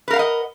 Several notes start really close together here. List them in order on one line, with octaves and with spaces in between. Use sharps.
B4 A#4 F5 F#5 D#5